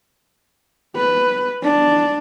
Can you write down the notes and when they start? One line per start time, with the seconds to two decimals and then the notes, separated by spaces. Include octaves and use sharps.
0.96 B4
1.62 D4